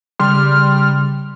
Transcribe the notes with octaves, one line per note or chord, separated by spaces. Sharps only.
C#3 G3 C6 F6